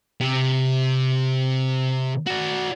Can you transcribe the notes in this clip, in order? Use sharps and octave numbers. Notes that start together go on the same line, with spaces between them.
C3
F#4 D5